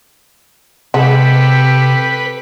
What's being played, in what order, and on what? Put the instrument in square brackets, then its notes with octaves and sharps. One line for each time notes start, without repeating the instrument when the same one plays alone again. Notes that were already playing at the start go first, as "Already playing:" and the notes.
[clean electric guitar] C3 [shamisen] G#3 F#5 [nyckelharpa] G4 A4 [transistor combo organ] B4